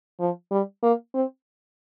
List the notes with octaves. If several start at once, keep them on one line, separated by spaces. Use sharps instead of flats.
F3
G3
A#3
C4